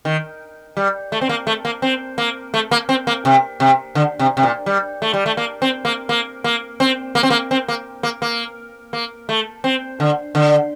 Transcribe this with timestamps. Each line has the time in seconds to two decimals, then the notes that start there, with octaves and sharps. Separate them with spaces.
0.05 D#3
0.77 G3
1.12 A3
1.21 C4
1.29 A#3
1.47 A3
1.65 A#3
1.82 C4
2.18 A#3
2.54 A3
2.71 A#3
2.89 C4
3.07 A#3
3.25 C3
3.60 C3
3.95 D3
4.19 C3
4.37 C3
4.43 A#2
4.66 G3
5.02 A3
5.14 G3
5.26 A3
5.37 A#3
5.62 C4
5.85 A#3
6.09 A#3
6.44 A#3
6.80 C4
7.15 A#3
7.23 C4
7.30 A#3
7.51 C4
7.68 A#3
8.03 A#3
8.22 A#3
8.93 A#3
9.29 A3
9.64 C4
10.00 D3
10.35 D3